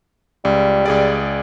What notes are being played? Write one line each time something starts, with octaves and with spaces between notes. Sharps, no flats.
C#2 G3
C#2 G#4 D5